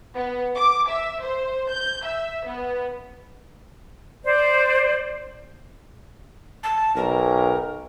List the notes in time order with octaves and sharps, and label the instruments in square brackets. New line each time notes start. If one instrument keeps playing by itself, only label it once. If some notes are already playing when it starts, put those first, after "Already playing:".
[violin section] B3
D6
E5
C5
G6
E5
B3
[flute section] C5 D5
[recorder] A5
[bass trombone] B1 [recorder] A#4